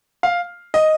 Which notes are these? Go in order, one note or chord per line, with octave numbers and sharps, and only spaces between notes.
F5
D#5